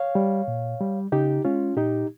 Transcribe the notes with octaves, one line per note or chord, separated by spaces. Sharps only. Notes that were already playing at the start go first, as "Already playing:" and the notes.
Already playing: C#5 F5
G3
A#2
G3
C#3 D#4 G4
G#3 C#4 F4
A#2 D#4 G4